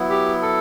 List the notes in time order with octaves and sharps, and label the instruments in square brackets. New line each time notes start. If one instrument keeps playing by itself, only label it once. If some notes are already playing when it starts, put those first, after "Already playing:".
Already playing: [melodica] F#3 B3 E4
[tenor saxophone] G4
A4